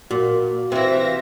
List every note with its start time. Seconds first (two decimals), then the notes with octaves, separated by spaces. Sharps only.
0.11 A#2 F#4
0.72 C3 E3 C4 E5 F5 A#6